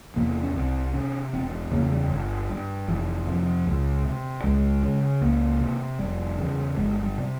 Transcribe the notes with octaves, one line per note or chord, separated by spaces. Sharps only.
E2 C3 A#3
C#4
C2 C4
C3 C#4
E1 C4
E2 C#3 A#3
G3
G1
G2
F1 E3
F2 C3
C#2
C3
C#2 G#3
C#3
C#2 A#3
C3
F1 G3
E2 C#3
G1 G#3
G3
C3